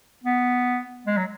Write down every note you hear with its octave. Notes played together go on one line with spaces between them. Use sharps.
B3
G#3
F#3